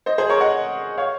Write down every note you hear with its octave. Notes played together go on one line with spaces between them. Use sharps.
C5 D#5
G#4 C5
A#4 C#5
D#5 F#5
C#5 F5